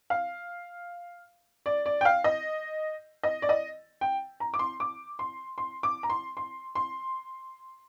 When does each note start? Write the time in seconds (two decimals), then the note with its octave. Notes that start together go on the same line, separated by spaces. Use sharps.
0.10 F5
1.66 D5
1.86 D5
2.01 G5
2.05 F5
2.24 D#5
3.23 D#5
3.42 D5
3.49 D#5
4.01 G5
4.40 A#5
4.54 D6
4.59 C6
4.80 D6
5.19 C6
5.58 C6
5.83 D6
6.03 A#5
6.10 C6
6.37 C6
6.75 C6